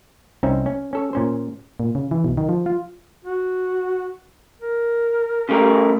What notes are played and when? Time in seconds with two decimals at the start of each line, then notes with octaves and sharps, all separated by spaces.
0.43 C2 C4 C#4 D#4 E5
0.66 C#4
0.93 C#4 A4 C#5
1.13 A#2 C#4 C5
1.80 A#2
1.95 C#3
2.11 E3
2.24 B1
2.37 D#3
2.49 F3
2.66 F4
3.25 F#4
4.61 A#4
5.49 C#3 A3 G4 A#4